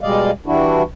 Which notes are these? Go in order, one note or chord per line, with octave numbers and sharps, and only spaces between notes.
B2 G3 G#3 D5 D#5 F5
E3 G3 D4 E4 F#4